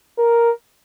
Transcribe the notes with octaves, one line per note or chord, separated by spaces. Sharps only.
A#4